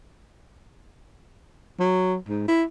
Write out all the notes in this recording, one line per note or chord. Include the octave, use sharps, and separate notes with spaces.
F#3
G#2
E4